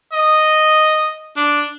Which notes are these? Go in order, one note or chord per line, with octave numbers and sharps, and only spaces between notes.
D#5
D4